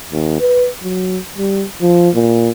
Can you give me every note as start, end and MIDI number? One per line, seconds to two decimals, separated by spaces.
0.12 0.39 39
0.40 0.68 71
0.83 1.18 54
1.38 1.64 55
1.82 2.09 53
2.15 2.50 46